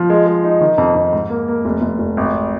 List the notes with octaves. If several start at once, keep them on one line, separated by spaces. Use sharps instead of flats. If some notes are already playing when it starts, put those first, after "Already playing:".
Already playing: F3
G#3
G#3
D#4
D#3
F2
F2
G#2
A#3
A#3
F1
F1
F1
G#1